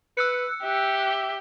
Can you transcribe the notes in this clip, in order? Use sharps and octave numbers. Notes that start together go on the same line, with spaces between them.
B4 E6 F#6 C#7
G4 E5